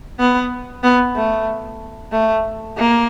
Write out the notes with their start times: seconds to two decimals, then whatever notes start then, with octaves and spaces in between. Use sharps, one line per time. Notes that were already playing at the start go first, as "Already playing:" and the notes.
0.19 B3
0.83 B3
1.15 A3
2.12 A3
2.77 A#3